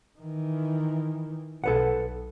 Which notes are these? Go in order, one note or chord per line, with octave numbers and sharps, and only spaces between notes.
D#3 E3
B1 B2 A4 B4 F#5